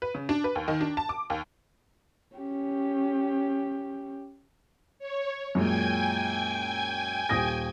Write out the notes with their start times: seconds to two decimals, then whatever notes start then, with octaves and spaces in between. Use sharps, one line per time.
0.02 B4
0.15 C#3
0.29 D4
0.44 B4
0.55 D#2
0.68 D#3
0.81 D4
0.97 A5
1.09 D6
1.30 D#2
2.36 C#4 G4
4.99 C#5
5.55 F#2 A#2 G#3 G5 G#5 G#6
7.29 D#1 D#6 A#6